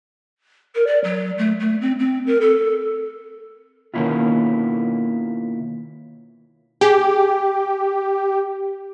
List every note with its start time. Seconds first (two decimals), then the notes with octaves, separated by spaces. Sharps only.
0.75 A#4
0.86 D5
1.04 F#3
1.38 A3
1.59 A3
1.81 C4
1.99 C4
2.26 A#4
2.40 A4
3.94 B2 D#3 A#3 C#4 E4 F4
6.81 G4 G#4